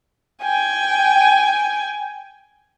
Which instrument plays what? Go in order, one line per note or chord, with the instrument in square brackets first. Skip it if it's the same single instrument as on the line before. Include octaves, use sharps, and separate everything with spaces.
[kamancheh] G5 G#5